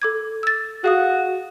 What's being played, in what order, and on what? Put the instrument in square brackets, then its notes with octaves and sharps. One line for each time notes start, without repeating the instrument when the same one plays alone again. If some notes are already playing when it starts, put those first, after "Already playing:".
[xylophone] A4 D6 G#6
E6 A6
[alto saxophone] F#4 [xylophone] G#4 F5 D#6